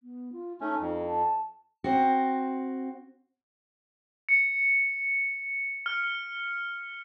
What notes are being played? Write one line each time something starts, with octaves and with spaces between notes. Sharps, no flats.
B3
F4
A3 C#4 D#4
F2
A5
C4 F#4
C#7
F6